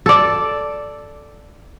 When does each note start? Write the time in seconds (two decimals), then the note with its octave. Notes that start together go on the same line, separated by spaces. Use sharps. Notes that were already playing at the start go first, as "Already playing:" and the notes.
0.06 A4 D5